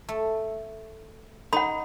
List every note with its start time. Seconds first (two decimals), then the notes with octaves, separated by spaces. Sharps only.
0.09 A3
1.53 D#4 F#5 B5